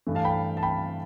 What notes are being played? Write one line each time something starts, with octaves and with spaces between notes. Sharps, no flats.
G2 E3 A3
F5 A5
G5 B5
A5
G5 B5